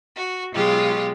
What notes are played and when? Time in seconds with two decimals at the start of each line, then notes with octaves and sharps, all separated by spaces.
0.16 F#4
0.53 B2 F#3 G#3 F4 G4